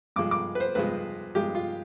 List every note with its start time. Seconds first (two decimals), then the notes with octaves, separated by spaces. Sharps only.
0.16 G2 F3 G#3 D6
0.31 D6
0.55 B4
0.60 C5
0.75 G2 F3 G#3 B4
1.35 G2 F3 G#3 G4
1.55 F4